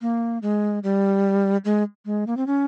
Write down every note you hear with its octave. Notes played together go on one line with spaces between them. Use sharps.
A#3
G#3
G3
G#3
G#3
A#3
C4
C#4